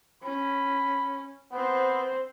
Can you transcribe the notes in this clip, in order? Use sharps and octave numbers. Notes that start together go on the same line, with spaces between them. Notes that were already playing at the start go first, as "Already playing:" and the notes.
C#4 B5
B3 C4 C5